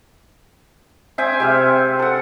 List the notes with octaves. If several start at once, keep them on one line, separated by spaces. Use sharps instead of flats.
C4 E5 G5 G#5
C3 E5 F5
A4 F#5